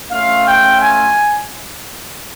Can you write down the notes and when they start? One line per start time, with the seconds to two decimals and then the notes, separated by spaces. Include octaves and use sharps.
0.11 A3 C#4 F4 F5
0.45 G5
0.80 G#5